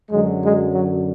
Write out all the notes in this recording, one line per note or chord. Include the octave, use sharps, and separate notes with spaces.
F#2 D3 F#3 G#3
G#3
F#3